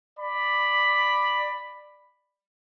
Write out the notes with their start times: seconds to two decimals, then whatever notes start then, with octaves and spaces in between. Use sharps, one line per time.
0.19 D5 B5